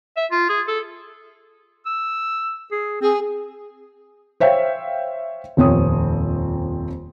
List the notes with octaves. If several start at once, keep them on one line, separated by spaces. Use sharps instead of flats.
E5
F4
G#4
A4
E6
G#4
C4 G#4
C5 C#5 E5 F5 G5
D#1 F2 C4 C#5 D#6